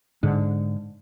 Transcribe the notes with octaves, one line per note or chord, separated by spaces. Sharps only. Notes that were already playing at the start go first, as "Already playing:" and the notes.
G#2 D3